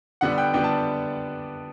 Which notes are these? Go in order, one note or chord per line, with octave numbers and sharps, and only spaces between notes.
D3 G3 B3 D4 F#5
G5
D3 G3 B3 D4 G5
A5